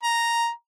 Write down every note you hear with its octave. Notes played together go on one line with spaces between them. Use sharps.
A#5